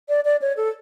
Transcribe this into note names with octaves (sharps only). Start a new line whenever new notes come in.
D5
D5
C#5
A4